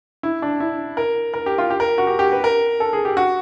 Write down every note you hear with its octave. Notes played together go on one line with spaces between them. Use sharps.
E4
D4
E4
A#4
A#4
G4
F4
G4
A#4
F#4
G4
G4
B4
A#4
A4
G#4
G4
F#4